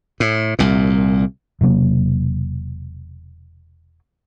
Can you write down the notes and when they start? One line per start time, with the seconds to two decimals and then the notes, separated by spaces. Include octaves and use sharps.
0.20 A2
0.59 C2 A#2
1.61 E1 C3 F#3 A#3